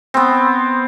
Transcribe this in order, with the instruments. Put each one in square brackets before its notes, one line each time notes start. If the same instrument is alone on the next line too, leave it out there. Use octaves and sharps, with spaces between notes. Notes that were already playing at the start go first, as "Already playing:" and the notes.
[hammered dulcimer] B3 C4